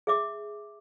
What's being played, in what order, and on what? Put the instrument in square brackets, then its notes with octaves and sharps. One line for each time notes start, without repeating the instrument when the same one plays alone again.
[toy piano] G#4 E5 D6